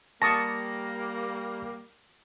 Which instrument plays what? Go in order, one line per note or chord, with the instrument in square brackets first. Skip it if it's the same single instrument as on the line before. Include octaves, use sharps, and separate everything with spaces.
[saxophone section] G3 A#3 [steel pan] A5 C#6 D#6 [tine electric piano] A#6